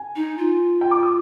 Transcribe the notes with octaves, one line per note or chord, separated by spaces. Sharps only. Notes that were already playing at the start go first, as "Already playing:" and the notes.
Already playing: G#5
D#4
F4
G5
D6
D#6